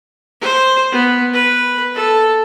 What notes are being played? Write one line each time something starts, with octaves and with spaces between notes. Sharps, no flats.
C5
B3
B4
A4